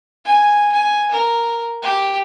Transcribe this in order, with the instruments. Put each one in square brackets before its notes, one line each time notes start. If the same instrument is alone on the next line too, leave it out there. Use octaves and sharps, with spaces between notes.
[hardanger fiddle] G#5
G#5
A#4
G4